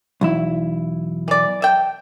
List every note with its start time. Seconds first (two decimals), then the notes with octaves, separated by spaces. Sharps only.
0.21 B1 E2 E4
1.28 E3 D5
1.62 E5 G5